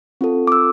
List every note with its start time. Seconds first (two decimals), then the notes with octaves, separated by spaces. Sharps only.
0.21 C4 F4 A4
0.47 D6
0.52 E6